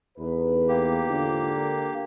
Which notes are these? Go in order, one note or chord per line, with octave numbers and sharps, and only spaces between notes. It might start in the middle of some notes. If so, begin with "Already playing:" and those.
E2 D#4 A4 B4
A#3 G4
G#2 D3 F4
A#4